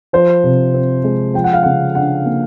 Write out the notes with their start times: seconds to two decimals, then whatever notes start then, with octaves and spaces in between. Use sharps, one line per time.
0.13 F3 C5
0.44 C3
0.74 C4
1.04 G#3
1.34 F3 G5
1.44 F#5
1.53 F5
1.63 C#3 F#5
1.95 D4 F#5
2.25 A#3